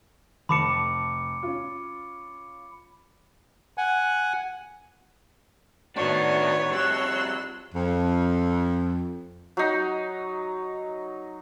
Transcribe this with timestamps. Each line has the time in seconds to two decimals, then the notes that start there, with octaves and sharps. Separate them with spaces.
0.49 F1 A5 B5 D6 C#7 E7
1.43 C#4 F4
3.77 F#5 G#5
5.96 A2 D#3 B3 D4 F#4 C#5
6.72 F2 G3 C6 E6 F#6
7.74 F2
9.57 F#3 D#4